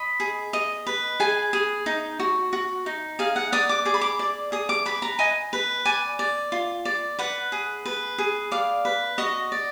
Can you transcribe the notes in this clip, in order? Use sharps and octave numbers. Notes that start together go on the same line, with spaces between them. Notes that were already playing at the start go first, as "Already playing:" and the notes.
Already playing: D#5 B5
G#4
D#5
B4
G#4 G#5
G#4
D#4
F#4
F#4
D#4
G#4 F5
F#5
D5 D#6
D6
G#4 D6
B5
D6
D5
G#4 D#6
D6
B4 B5
A#5
D#5 G#5
B4
D5 G#5
D5
F4
D5
B4 F#5
G#4
B4
G#4
D5 F5
B4
F#4 D#5
D5